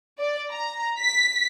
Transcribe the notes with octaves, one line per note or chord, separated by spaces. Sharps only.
D5
A#5
B6